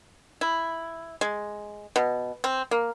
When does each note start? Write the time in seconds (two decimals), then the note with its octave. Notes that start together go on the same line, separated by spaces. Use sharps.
0.41 E4
1.21 G#3
1.96 B2
2.44 C4
2.71 A#3